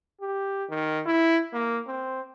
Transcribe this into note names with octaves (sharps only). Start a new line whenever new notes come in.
G4
D#3
E4
A#3
C4